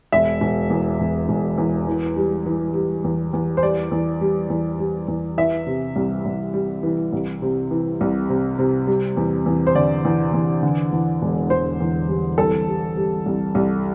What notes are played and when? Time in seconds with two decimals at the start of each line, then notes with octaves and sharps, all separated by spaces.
0.12 E1 E5
0.41 E1
0.70 E2
1.00 E1
1.29 E1
1.58 E2
1.88 E3
2.17 G3
2.46 E3
2.74 G3
3.04 E2
3.33 E2
3.57 C5
3.62 G3 D5
3.91 E2
4.21 G3
4.50 E2
4.79 G3
5.08 E2
5.37 E3 E5
5.67 C3
5.96 C2
6.26 C2
6.54 G3
6.83 E3
7.13 C2
7.42 C3
7.71 E3
8.01 C2
8.29 C3
8.59 C3
8.87 G3
9.17 E2
9.46 E2
9.67 C5
9.75 D3 D5
10.05 E2
10.34 E2
10.63 D3
10.92 E2
11.22 E1
11.50 E1 C5
11.80 E2
12.09 G3
12.38 C2 A4
12.68 G3
12.97 G3
13.26 C2
13.55 C2